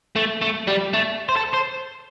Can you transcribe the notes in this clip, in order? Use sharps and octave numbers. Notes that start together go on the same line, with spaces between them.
A3
A3
G3
A3
C5
A4
C5